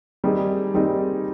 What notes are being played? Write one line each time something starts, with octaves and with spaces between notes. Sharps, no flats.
D#3 G3 C4 D#4 G#4
D#3 G3 C4 D#4 G#4